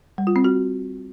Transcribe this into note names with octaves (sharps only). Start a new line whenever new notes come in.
G3
F4
C4
F#4